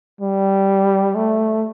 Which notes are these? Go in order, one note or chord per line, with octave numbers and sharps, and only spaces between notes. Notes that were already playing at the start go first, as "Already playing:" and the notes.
G3
A3